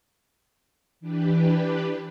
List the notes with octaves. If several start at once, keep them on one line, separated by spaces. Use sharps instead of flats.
E3 D4 G4 B4